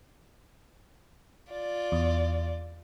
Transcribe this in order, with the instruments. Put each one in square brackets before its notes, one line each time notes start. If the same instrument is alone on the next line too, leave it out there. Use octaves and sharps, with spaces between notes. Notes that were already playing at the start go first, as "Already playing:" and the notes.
[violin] F4 D5
[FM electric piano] E2